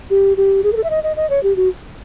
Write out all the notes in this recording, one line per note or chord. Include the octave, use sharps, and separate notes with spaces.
G4
G4
G#4
A#4
A4
E5
D#5
D#5
D#5
C#5
G4
F#4